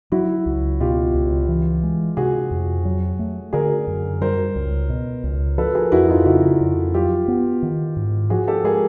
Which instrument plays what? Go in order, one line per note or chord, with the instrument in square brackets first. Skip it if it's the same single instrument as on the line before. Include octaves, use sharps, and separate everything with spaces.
[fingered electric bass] F#3 [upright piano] E4 F#4
[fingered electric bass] C#2
[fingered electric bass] B2 [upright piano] F4 G4
[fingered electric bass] C#2
E3
G#3
[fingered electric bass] C3 [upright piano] F#4 G#4
[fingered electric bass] F2
F#3
A3
[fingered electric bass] D3 [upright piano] G#4 A#4
[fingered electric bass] F#2
[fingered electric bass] G3 [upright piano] A#4 C5
[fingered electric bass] C#2
B2
C#2
[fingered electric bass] F3 [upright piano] A4 B4
[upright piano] G#4 A#4
[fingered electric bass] F2 [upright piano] E4 F#4
[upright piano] D#4 F4
[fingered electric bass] C#3 [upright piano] E4 F#4
[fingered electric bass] F2
[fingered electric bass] F#3 [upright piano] F4 G4
[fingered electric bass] B3
D#3
G#2
[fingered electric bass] F3 [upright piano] F#4 G#4
[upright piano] G4 A4
[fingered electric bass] G#3 [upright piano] G#4 A#4